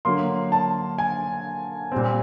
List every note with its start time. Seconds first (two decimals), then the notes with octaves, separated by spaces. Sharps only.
0.05 D3 F#3 A#3 C6
0.52 A5
0.98 G#5
1.92 A#2 G3 C4